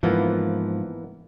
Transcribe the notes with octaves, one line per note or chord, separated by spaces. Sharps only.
G#2 E3 F3 A#3 B3